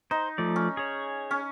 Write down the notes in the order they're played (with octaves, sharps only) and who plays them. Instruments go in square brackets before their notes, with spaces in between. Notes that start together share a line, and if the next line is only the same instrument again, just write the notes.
[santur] D#4 [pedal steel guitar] C5
[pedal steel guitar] F3 A3 D5
[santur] C#4
[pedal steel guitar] G#4 C#5
[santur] C#4